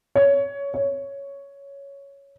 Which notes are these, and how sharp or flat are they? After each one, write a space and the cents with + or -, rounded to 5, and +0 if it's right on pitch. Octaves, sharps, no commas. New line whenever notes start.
C#5 +15
C#5 +5